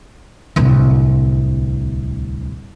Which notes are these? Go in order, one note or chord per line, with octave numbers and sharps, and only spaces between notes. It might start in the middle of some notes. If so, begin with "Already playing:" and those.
D1 C2